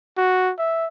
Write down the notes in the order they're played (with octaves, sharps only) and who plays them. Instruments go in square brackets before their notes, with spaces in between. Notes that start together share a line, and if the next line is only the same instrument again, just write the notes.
[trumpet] F#4
E5